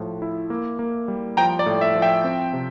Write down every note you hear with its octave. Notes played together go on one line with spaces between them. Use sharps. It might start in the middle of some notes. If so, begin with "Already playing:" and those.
Already playing: A2 F3
E4
A#3
A#3
G3
F3 G5 A#5
D5
A2
E5
F3
E5 G5
C4
C3